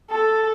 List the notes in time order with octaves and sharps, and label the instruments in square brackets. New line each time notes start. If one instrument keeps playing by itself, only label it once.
[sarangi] A4